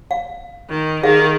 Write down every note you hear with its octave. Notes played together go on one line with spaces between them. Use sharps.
F5
D#3
D#3 G#4 E5 F5